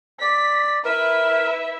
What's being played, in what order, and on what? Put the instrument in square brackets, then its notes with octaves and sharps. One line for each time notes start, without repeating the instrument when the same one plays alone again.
[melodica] D5 [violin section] B6
[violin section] E4 B4 E5 [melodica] A#4